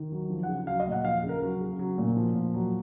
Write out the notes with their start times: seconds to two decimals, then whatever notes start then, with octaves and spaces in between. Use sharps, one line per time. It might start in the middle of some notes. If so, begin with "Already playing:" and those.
Already playing: D#3
0.12 F#3
0.30 F3
0.43 F#5
0.48 C#3
0.67 F#3 F5
0.80 D#5
0.87 A#2
0.92 F#5
1.05 F3 F5
1.23 C#3
1.29 A#4
1.43 F#3
1.61 C#3
1.79 F#3
1.98 A#2
2.16 F3
2.35 A#2
2.54 F#3